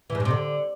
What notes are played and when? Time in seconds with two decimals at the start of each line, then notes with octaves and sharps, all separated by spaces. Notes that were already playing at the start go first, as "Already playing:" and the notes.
0.10 E3
0.15 G#2
0.20 G2
0.25 C3
0.31 D3